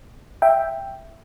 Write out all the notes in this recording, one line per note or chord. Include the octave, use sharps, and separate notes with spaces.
E5 G5